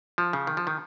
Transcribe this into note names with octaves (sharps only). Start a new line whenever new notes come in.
F3
C#3
D#3
F3
D#3